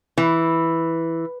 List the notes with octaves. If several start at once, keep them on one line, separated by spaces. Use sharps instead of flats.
E3